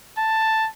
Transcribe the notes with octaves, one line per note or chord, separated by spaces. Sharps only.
A5